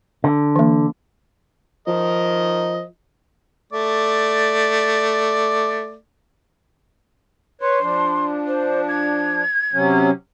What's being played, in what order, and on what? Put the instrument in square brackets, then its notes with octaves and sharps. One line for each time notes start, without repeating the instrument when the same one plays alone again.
[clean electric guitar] D3
[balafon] E3 A#3
[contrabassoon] F3 [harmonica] A#4 D#5
[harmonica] A3 D5
[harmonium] B4 C#5 [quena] C6
[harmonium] F3 D4
[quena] C5
G#6
[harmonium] C3 F#3 C#4